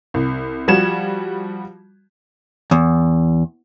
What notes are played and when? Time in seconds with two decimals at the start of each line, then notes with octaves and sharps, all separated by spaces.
0.14 C2
0.68 F3 G3 F#4 G#6 E7
2.71 E2